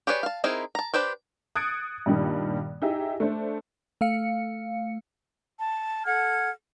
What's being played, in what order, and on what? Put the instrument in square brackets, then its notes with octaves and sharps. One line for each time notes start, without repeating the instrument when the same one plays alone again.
[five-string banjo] G4 G#4 B4 C#5 D5
F5 A5
C4 D#4 E4 G#4 A#4
A5 A#5
D4 G4 B4 C5
[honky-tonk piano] D#6 F#6 G#6 A6 C#7 D7
G2 A#2 D#3 G3
D#4 E4 G4 G#4 E5
A3 D4 C5
[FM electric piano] A3 F5 C#7
[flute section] A5
A4 F#5 F6 G#6